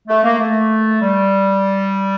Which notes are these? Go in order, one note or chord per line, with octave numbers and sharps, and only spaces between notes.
A3
A#3
A3
G3